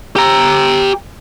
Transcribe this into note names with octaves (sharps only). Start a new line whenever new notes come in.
G4 A#5